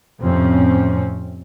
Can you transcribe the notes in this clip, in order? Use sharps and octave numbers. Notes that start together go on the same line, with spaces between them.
F2 A2 C3 C4 C#4